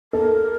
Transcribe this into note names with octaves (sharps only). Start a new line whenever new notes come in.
A4 A#4